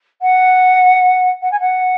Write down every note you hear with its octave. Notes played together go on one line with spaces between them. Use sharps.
F#5
F#5
G#5
F#5